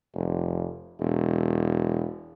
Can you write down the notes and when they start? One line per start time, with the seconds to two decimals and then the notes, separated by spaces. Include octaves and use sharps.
0.14 F1
1.00 E1